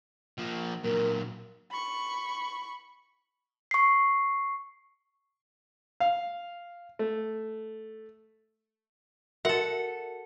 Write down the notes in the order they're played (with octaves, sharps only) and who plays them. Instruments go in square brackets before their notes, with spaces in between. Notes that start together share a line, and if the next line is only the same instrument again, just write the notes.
[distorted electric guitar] F3 A#3
[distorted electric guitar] A#2 F#3 [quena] A#4
[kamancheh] B5 C#6
[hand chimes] C#6 C7
[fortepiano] F5
A3
[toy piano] F#4 A#4 E5 [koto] A4 F#5